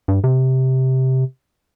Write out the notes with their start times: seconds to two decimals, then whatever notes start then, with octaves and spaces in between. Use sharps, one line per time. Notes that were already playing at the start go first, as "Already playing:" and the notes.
0.08 G2
0.24 C3